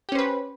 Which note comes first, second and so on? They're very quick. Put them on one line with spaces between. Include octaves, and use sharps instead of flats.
G4 C#4 C5 B4